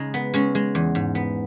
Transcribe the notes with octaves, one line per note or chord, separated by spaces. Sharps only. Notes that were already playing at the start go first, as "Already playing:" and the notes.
Already playing: C#3 G#3 D#4
B3
G#3 C#4
G#3
E2
G#2
B3